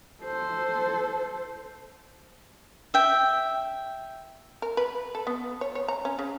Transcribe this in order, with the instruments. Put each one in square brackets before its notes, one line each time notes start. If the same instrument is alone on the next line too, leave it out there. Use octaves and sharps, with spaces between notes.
[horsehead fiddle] A4 C5
[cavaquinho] E5 G5
[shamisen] A#4
B4
A4
B3
C#5
C#5
A#5
C#4
C#3